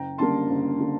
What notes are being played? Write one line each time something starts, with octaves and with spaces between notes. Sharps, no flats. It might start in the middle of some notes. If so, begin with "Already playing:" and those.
Already playing: F#1 G5 A#5
F#2 D3 G3 A#3 A5 C6
F#1
D3 G3 A#3